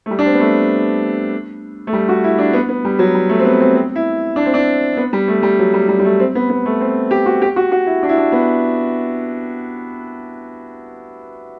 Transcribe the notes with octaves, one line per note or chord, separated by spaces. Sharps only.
A3
G3
D4
C4
B3
A3
A3
G3
F#4
E4
D4
B3
B3
G3
F#3
G3
A3
C4
B3
C4
C4
E4
D4
C4
D4
B3
G3
A3
G3
F#3
G3
G3
G3
A3
C4
B3
B3
A3
C4
G4
F#4
G4
F#4
F#4
E4
D4
E4
D4
B3